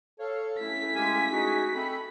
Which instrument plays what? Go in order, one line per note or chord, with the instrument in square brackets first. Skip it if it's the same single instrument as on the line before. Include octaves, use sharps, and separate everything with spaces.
[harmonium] A4 [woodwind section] C#5 F5
[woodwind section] A3 C#4 E4 [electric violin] B6
[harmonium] G#3 G4 F5 [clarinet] G#5
[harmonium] D#4 G#4 [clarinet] F#4
[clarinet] C4 [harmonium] A4 [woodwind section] E5 B5